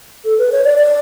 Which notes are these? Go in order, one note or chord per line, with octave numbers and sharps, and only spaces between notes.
A4
B4
C#5
D5
D5